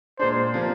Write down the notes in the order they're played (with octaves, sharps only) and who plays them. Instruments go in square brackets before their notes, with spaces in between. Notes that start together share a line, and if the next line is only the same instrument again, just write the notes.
[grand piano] A#2 G#3 D4 [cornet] C5
[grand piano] C3 F3 A#3 D4